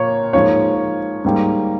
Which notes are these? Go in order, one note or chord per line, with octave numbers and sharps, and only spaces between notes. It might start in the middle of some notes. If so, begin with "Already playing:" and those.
Already playing: A#2 F3 A#3 C#5
G#2 F3 A#3 C#5
G#2 G3 A#3